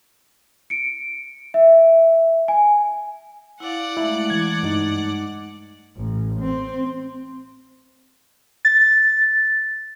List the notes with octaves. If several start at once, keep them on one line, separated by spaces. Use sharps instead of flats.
C#7 D7
E5
G#5
E4 D5 F5 F#5
G#3 A3 E4
E3 G#6
G2 D#4
A1
C4
A6